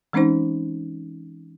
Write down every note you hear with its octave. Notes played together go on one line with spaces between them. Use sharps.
E3 G#3 C4 C#4 D#4 C5